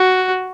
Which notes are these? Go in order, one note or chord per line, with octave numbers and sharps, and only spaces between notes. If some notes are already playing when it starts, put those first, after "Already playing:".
Already playing: F#4